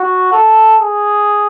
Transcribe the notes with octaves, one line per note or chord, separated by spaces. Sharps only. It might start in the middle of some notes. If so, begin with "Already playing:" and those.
Already playing: F#4
A4
G#4